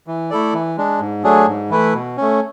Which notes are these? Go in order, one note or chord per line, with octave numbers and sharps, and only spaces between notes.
E3
A3 E4 A4 D5
E3
G#3 D4
G#2
F#3 A3 D4 G#4
G#2
E3 A3 E4 B4
B2
A3 C#4